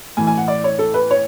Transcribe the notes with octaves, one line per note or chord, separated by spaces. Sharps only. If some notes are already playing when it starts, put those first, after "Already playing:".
A2 E3 G#5
G#5
F#5
D5
C#5
A4
B4
C#5